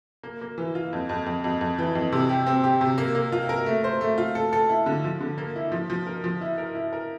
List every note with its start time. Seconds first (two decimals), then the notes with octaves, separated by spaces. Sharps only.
0.23 A#3
0.41 A#3
0.58 E3
0.75 F4
0.93 F2
1.09 F2
1.26 F2
1.44 F2
1.61 F2
1.78 E3
1.95 F2
2.12 C3
2.29 G4
2.47 C4
2.64 G4
2.81 C3
2.98 A#3
3.15 A#3
3.32 F4
3.49 A#4
3.66 A3
3.84 C5
4.01 A3
4.18 F4
4.35 A4
4.53 A4
4.69 E4
4.86 D3
5.04 F3
5.21 D3
5.38 A#3
5.56 E4
5.72 F3
5.90 F3
6.07 A#4
6.24 F3
6.41 E4
6.58 A#4
6.75 E4
6.93 A#4